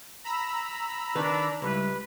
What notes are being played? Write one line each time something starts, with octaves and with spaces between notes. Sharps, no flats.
A#5 B5 E6
D#3 D4 B4
C#2 G3 E4 B4